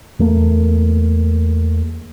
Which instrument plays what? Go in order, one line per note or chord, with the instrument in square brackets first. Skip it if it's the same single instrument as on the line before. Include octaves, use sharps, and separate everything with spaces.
[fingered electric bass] E2 A3 A#3